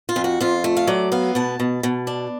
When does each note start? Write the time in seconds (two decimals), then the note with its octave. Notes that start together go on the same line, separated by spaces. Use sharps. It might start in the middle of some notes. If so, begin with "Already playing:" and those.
0.09 F4
0.16 F2
0.24 F#4
0.41 F2 F4
0.64 A3
0.77 F5
0.87 F#3 D5
1.12 B3 F5
1.35 B2 A5
1.60 B2
1.83 B2
2.07 D4